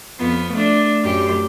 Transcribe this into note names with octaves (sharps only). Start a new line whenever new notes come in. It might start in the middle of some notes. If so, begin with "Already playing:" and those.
F2 B3
A3 D4
F#2 A2 G4